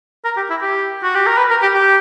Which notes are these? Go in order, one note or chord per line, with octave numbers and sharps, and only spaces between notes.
A#4
G4
E4
G4
F#4
G4
A#4
B4
A#4
G4
G4